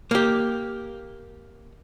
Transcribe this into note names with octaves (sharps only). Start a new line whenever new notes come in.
A#3 G4